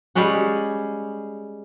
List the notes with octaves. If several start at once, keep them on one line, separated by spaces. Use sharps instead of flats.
G3 G#3 C#4 F#5